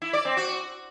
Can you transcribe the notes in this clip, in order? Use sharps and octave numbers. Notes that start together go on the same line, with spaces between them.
E4
D5
C4
F#4